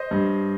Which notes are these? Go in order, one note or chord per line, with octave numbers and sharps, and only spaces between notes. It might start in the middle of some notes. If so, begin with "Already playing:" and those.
Already playing: C5 D#5
G2